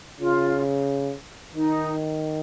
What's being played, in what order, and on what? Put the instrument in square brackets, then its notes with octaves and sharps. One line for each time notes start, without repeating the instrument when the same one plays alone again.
[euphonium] C#3 [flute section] F4
[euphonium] D#3 [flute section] D#4